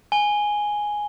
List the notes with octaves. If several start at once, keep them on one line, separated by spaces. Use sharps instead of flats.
G#5 G7